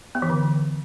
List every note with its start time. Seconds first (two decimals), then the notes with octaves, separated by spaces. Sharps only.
0.15 B3
0.22 E3
0.30 D3